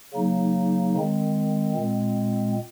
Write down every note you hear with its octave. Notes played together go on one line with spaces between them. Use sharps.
C#3 F#3 A#3 D#4
D#3 G#3 C4
A#2 G#3 C4